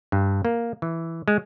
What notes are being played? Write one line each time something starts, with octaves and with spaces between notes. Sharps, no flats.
G2
A#3
E3
G#3